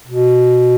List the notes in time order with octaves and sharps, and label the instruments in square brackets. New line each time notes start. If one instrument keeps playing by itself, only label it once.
[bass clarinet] B2